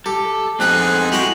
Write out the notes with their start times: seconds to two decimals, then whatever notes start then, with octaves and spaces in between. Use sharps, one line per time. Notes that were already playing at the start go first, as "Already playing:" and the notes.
0.06 G4 A4
0.60 F2 B3 C4 D#4 G#4 B5 F#6
1.12 G#3 E4 F#4 G4 F#5 F#7